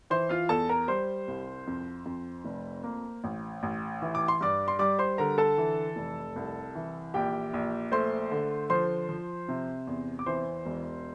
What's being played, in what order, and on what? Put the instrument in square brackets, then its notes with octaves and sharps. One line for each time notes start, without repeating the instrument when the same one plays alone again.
[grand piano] E3 C5 C6
F4 F5
E2 A4 A5
A#4 A#5
G3 C5 C6
C2
F2
F2
F1
A#3
A1
A1
E3
D6
C6
G2 D5 D6
C6
G3 D5 D6
C5 C6
D3 A#4 A#5
A4 A5
E3
F1
C2
E3
A#1 G4 G5
A#1
A3 C5 C6
D3
F3 C5 C6
F3
C3
E2
D6
E3 C5 C6
E1